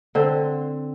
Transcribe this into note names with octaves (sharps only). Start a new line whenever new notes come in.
D3 C4